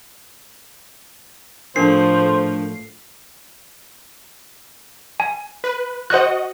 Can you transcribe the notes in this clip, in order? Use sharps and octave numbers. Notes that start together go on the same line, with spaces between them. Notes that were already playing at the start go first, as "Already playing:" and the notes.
A2 F3 A3 D4 A#4 C5 C7
G#5
B4
F#4 C5 D#5 F#5 F#6